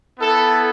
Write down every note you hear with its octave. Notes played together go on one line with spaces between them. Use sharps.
B3 E4 A4